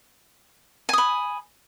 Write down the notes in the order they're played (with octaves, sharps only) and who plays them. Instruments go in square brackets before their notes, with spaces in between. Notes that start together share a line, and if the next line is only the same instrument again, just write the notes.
[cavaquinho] G#5
D#6
B5